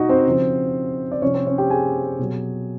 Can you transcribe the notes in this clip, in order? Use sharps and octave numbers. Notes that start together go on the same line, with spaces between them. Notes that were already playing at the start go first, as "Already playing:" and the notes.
Already playing: B2 G3 D#4 F#4 D#5 F#5
C4 C5
C#3 F3
D5
C3 F3 C#4 C#5
C4 C5
C#4 C#5
G4 G5
G#4 G#5
B2 F#3